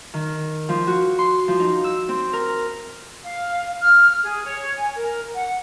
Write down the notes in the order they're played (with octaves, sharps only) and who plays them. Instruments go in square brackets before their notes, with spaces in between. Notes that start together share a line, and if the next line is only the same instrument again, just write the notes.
[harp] D#3
F3
F#4
C6
F3
D#4
E6
C4
A#4
[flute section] F5
F6
G#4
C#5
G#5
A#4
F#5